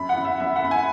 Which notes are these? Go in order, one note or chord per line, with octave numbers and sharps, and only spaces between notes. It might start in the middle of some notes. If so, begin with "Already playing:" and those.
Already playing: F#2 B5
F#5
F#2
E5
F#2 E5
F#5
F#2 B5
G#5